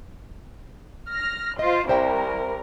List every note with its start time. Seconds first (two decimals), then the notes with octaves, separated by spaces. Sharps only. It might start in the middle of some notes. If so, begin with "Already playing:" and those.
1.09 F6 A#6
1.59 F4 C5 D#5
1.89 C2 A#4 C5 E5 G5